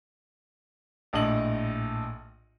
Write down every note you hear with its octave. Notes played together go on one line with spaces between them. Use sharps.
A#1 A2 D#5 F#7